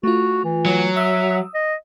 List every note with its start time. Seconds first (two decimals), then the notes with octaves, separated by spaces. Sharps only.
0.03 A3 F4 F#4
0.44 E3
0.66 F#3
0.96 E5 D#6 E6
1.54 D#5